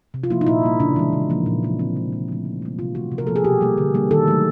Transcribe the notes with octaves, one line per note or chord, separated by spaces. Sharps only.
C3
F4
F3 A#3 E4
D#4
A#2 E4
G3 A#3
C#3 D4
E3 G#3
C#3
F3 A#3
A#2
F#3 A#3
D3 C4
F3 G#3
A#2
F3 A3
D3
G3 A#3
C3 F4
E3 A3 F#4
C3
A#4
F3 A#3 A4
G#4
B2 G4
G3 A#3
D3
G3 A#3
D#3 A4
F#3 A3